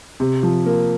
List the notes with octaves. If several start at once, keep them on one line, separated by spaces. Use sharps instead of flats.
C3
F3
A#3